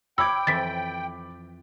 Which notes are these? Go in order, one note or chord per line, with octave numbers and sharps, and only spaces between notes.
C#5 G5 B5 D6 E6 G#6
F2 E3 A6 B6